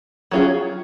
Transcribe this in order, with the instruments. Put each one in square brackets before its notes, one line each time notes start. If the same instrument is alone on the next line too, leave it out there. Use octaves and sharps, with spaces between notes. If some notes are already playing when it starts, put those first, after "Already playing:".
[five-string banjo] F#3 C#4 F4 G#4